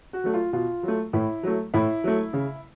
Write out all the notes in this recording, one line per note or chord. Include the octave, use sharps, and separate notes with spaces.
F#4
F#3 A3
F4
B2 F4
F#3 A3
A2 E4
F#3 A3
A2 E4
F#3 A3
C#3